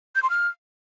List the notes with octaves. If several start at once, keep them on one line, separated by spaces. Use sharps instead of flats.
G6
C6
F6